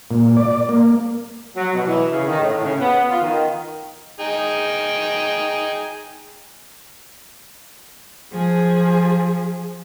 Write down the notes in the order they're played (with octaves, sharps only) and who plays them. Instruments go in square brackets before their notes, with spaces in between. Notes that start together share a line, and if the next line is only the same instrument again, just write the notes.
[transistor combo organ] A#2
D5
A#3
[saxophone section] F#3
B2
E3
C#3
D#3
A2
C#3
B3
F4
D#3
[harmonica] D#4 G#4 G5
[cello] F3 G#4